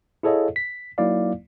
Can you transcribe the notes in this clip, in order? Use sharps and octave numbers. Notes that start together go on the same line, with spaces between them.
E4 G#4 A4 C#5 D#5 F5
B6
F#3 A#3 D#4 E4 D5 F5